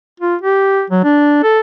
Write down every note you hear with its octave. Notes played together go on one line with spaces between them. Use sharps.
F4
G4
F#3
D4
A4